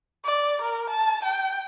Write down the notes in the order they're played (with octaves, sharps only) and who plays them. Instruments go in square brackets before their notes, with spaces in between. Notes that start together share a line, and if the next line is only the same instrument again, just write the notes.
[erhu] D5
A#4
A5
G5